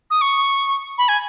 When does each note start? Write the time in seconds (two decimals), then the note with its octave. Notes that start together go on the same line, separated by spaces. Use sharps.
0.10 D#6
0.21 C#6
0.98 B5
1.08 G#5